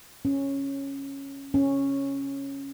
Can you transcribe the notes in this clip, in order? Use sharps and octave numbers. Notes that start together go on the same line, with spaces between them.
C#4
C#4